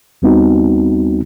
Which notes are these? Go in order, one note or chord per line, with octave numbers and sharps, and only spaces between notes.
D#2 G3 B3 C4 D#4 F#4